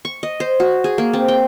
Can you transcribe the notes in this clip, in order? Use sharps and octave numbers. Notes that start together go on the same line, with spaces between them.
C#6
D#5
C5
F#4
G#4
A#3
C4
G5